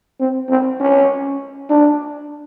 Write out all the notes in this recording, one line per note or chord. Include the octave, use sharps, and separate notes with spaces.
C4
C4
C#4
D4